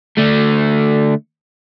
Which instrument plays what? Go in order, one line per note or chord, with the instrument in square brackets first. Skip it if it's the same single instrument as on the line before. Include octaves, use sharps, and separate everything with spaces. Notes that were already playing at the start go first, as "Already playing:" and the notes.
[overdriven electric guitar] D3 A3